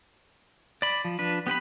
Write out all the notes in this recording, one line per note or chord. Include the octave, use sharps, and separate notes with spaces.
D5 B5
F3
F3 D4 B4
B3 G4 B4 B5